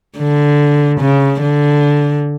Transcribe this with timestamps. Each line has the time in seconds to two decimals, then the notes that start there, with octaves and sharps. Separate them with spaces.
0.17 D3
1.00 C#3
1.41 D3